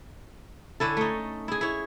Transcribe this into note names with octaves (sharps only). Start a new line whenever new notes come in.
D3 C#4 E4 A4
A3 D#4
E4 G#4
E4 C#5